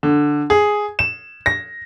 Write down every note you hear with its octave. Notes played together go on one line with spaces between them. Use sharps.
D3
G#4
E7
A#6